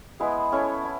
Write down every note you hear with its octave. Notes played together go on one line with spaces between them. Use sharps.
G#3 B3 E4 G#4
C#4 E4 A4 C#5
E4